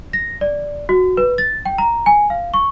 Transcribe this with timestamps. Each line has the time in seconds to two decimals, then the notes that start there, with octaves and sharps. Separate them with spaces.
0.13 A#6
0.41 D5
0.89 F#4
1.17 B4
1.38 A6
1.65 G5
1.78 A#5
2.06 G#5
2.30 F5
2.54 C#6